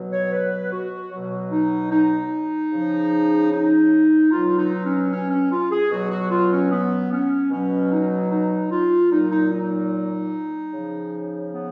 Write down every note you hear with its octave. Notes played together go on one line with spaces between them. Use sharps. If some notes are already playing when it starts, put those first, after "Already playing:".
Already playing: B2 F#3
C#5
B4
F#4
B2 F#3
D#4
D#4
C#3 F3
D#4
B2 F#3 F4
D#4
C#4
C#4
C#4
F4
G#4
B2 F#3 F#4
F#4
F4
C#4
B3
C#4
B2 F#3 C#4
D#4
D#4
F4
A#2 F#3 D#4
D#4
D#4
D#4
C#3 F3
B3